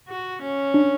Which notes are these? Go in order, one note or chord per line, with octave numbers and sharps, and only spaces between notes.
F#4
C#4
D4